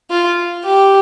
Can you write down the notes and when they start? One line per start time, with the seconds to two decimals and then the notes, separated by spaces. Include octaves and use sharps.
0.10 F4
0.64 G4